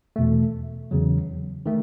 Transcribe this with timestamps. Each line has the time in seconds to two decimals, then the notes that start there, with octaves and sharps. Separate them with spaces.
0.16 E2 B2 A3
0.91 E2 C#3 F#3
1.66 D#3 A3